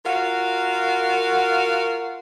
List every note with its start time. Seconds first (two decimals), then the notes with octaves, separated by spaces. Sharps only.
0.05 F4 F#4 A#4 F5